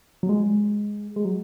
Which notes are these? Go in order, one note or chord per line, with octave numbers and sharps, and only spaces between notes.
F#3
G#3
G#3
F#3